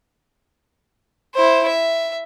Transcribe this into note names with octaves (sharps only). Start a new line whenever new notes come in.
E4 C5
E5